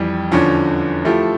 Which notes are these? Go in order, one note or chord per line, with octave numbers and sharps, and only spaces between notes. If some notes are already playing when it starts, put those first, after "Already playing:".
Already playing: F2 E3 G3
E2 D3 F3 C#4
F3 A3 E4 G4